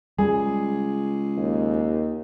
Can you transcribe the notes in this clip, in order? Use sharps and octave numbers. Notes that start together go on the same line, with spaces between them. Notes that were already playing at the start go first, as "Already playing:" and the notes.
C#2 G3 G#4
D#2